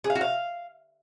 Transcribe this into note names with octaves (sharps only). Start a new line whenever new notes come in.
G#4
F5
F#4
F5